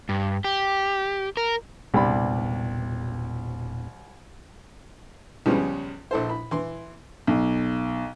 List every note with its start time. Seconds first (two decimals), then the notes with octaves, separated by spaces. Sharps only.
0.09 G2
0.44 G4
1.37 A#4
1.94 E1 C2 A#2 B3 D4 B5
5.46 C#2 F3 G3 G#3 B3 C#4
6.11 A#1 A4 C5
6.29 B5
6.51 E3 C6
7.27 B1